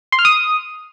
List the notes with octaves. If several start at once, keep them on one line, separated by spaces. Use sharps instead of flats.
C6
F6
D#6